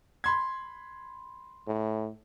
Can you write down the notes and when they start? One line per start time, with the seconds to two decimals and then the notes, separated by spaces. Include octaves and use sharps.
0.24 B5 C6 G#6
1.68 A2